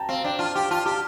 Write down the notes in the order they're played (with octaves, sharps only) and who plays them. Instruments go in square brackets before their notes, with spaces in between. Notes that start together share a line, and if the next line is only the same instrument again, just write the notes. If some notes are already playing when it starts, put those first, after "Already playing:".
Already playing: [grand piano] G5 A5 A#5
[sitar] C4 [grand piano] F5
[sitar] D4 [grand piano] G5
[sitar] F4 [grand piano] A5
[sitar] G4 [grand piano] G5
[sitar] F4 [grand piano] A5
[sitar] G4 [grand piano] A5